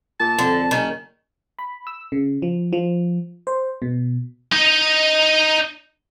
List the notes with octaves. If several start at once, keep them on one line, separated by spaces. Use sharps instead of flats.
A#2 A5
F2 D3
F#1 D#3 C#4
B5
E6
C#3
F3
F3
C5
B2
D#4 D#5